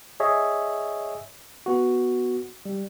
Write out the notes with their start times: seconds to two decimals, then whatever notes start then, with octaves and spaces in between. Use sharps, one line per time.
0.20 G#4 C#5 D#5 E5
1.66 B3 F#4
2.65 G3